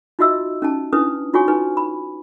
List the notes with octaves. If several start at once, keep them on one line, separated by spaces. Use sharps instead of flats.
D#4 F4 F#4 D#5 E5 E6
C#4 D#4 A5
C#4 D4 E4 B4 D#6
D#4 F4 F#4 C#5 G#5 C#6
D#4 B4 G#5
B5